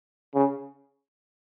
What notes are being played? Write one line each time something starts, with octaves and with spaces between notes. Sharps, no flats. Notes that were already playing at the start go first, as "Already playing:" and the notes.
C#3